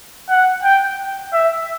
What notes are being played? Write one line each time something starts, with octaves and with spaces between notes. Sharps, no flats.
F#5
G5
E5